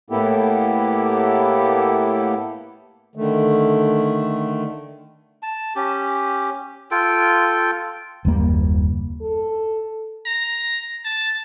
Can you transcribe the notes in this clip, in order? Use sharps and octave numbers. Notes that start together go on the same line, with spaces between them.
A2 A#3 B3 E4 G4 A4
D3 D#3 A3
A5
C#4 G4
F4 A4 G5
F#1 D#2 G3 A#3
A4
A#5
A5